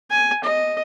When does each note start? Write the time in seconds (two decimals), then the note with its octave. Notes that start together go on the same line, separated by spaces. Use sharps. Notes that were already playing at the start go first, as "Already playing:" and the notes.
0.11 G#5
0.44 D#5